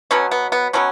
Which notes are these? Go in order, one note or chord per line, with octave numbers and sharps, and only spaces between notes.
B2 F#3 B3 C#4
B3
B3
B2 F#3 B3 C#4